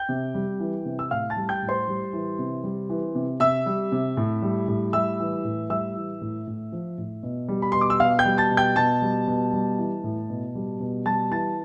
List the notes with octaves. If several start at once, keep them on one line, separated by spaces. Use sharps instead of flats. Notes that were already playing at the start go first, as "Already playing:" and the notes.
Already playing: G5 G6
C3
G3
E3
C3
E6
A2 F5 F6
A5 A6
G3
G5 G6
A2
C5 C6
G3
E3
C3
G3
E3
C3
C3 E5 E6
G3
C3
A2
G3
A2
G3 E5 E6
E3
A2
G3 E5 E6
E3
A2
A2
F3
A2
B2
G3
B5
B2 C6
D6
E6
B2 F5 F6
G5 G6
G3
A5 A6
B2
G5 G6
B2 A5 A6
G3
B2
G3
E3
A2
B2
G3
B2
G3 A5 A6
E3 A5 A6